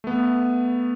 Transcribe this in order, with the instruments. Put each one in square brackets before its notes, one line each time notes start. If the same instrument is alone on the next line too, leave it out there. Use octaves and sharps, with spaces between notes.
[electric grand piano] A3 B3